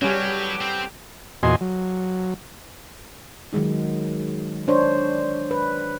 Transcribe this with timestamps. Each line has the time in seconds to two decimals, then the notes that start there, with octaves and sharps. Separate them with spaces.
0.02 A2 F#3 G3 B3 C#4 G4
0.61 C4
1.43 E2 A#2 F#4 D#5 G#5 C6
1.61 F#3
3.53 D#3 F#3 G#3 D#4
4.68 D4 C5 C#5
5.51 B4